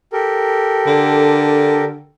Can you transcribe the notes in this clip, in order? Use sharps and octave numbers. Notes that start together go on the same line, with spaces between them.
G4 A4 A#4
D3